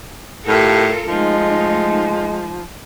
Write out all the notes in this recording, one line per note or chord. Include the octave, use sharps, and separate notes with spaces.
A2 F4 G4 A4 A#4
F3 G#3 A3 D#4